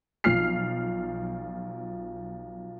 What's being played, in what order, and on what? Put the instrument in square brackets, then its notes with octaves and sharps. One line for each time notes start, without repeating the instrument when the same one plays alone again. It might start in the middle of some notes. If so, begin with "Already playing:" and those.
[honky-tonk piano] B1 F3 F6 C7